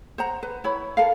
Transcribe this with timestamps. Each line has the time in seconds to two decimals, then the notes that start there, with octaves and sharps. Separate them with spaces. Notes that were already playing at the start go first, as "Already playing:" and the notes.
0.18 C5 F#5 A#5
0.43 B4
0.64 E4 C#5 B5
0.97 A4 A#4 F5